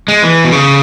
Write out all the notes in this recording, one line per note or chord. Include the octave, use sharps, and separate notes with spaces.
G#3
E3
B2
C#3